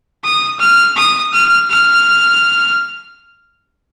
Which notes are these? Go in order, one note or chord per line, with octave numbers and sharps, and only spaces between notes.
D#6
F6
D#6
F6
F6